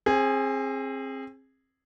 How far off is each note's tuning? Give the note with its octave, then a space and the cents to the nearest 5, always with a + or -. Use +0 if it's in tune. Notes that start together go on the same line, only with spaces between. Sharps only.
C4 +30 G#4 -5